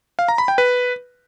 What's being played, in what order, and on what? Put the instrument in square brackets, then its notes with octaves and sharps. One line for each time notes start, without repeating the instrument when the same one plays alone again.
[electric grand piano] F5
A#5
B5
G5
B4